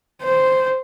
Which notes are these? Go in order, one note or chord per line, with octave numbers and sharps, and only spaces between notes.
C5